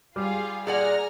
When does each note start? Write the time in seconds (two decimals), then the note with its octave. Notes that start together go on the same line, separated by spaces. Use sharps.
0.16 G3 F4 G#4 F5
0.67 A#2 G#4 D5 F#5 G#5 A#5 F6